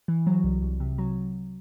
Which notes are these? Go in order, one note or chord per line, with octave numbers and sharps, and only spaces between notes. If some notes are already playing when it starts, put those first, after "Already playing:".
E3
F#3
C2
C2
C3
F#3